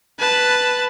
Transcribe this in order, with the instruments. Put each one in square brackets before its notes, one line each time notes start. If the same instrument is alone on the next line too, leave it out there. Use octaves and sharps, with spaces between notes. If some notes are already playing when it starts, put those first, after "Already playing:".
[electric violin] B4 A5